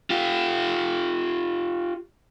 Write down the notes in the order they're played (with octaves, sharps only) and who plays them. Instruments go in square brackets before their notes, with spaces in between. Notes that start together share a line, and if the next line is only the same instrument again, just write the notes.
[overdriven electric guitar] F4 G4